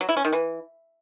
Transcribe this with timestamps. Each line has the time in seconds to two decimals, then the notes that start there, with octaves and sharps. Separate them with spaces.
0.01 F#3
0.09 E4
0.17 C#4
0.25 D#3
0.33 E3